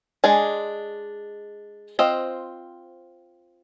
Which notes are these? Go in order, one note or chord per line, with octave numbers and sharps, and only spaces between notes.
G#3 D4 G#4
C4 F4 C5 D#5